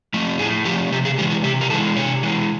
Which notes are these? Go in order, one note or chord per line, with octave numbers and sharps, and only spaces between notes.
F3 A3
A2 G#4
F3 A3 G4
C3 G4
G#4
E3 G#3 G4
F#4
C3 G4
A#4
E3 G#3 A4
C3 C#5
E3 G#3